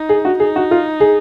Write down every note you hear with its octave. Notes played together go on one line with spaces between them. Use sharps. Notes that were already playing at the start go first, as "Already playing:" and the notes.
Already playing: D#4
G#4
F#4
D#4 G#4
F#4
F4
G#4